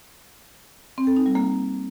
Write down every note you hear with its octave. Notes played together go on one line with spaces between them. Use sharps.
C4
A4
D#4
G3
A#3